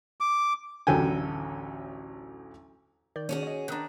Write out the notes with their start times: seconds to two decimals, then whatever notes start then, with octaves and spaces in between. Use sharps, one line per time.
0.20 D6
0.87 A1 D2 F#3 A4 G5 G#5
3.16 D#3 D5 G6
3.29 D#3 C#4 F#4 G#4
3.43 C#5 D#5
3.68 D#3 D4 A#5 D#6 F#6